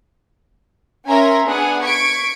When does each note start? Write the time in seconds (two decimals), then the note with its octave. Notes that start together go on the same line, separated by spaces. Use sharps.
1.07 C#4 A#4 E5 G#5 A#5 C6
1.46 B3 D4 G#4 F#5 G#5
1.83 C#6 G#6 B6 D7